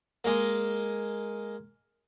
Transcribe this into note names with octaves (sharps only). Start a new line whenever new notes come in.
G#3 A#3